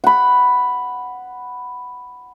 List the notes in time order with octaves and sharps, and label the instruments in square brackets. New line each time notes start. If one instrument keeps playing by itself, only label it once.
[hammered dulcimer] F#5 B5